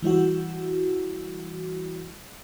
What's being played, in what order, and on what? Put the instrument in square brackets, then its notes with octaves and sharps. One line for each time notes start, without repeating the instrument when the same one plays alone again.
[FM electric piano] E3 G3 E4 F#4